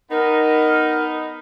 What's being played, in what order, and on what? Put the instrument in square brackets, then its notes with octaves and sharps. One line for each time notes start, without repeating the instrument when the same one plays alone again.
[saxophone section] B3 D#4 [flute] A#4